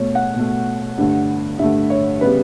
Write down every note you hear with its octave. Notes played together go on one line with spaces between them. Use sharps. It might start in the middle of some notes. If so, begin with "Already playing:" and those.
Already playing: B2 A3 C#5
F#5
B2 A3
G2 D3 A3
G2 D3 A3 E5
C#5
C#3 G3 B3 B4